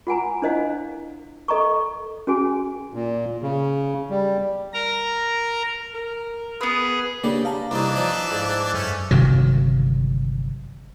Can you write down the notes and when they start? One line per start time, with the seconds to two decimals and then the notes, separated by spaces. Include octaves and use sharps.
0.07 F4 F#5 G#5 A#5
0.42 D4 E4 C5 D#5 F5 F#5
1.48 A4 D#5 A#5 C#6
2.27 C#4 F#4 G#4 G#5
2.94 A#2
3.42 C#3
4.10 G3
4.73 A#4 A#5
5.94 A#4
6.61 B3 G#4 B4
7.24 C#3 G3 A#3 D4 G4
7.45 F5 A5 A#5
7.71 C2 E3 D4 D#4
7.96 F3 D#4 D5
8.31 G#2
8.74 F#2 A3 C#4
9.11 G1 C3 D#3 F#3